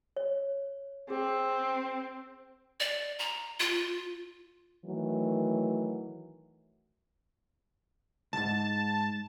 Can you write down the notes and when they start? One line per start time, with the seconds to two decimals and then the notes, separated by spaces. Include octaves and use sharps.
0.17 C#5
1.10 C4 G#4
2.80 D5
3.19 A#5
3.60 F4
4.86 D#3 E3 F#3 A3
8.33 C2 G#2 A5